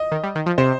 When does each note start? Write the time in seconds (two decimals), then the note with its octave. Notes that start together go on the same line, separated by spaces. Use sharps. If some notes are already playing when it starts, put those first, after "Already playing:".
Already playing: D#5
0.12 D#3
0.24 G3
0.35 D#3
0.46 F3
0.58 C3 C5